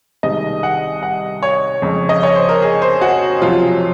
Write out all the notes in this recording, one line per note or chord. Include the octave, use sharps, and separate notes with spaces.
C2 C3 D#3 G#3 D#5
F#5
F#5
C#5
F2 C#3 G#3
D#5
C#5
C5
A#4
G#4
C5
F#4
F2 C3 F#3 F4